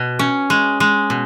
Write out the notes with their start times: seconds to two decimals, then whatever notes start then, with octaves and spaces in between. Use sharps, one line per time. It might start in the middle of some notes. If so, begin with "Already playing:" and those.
Already playing: B2
0.19 C#4
0.50 G#3
0.80 G#3
1.10 B2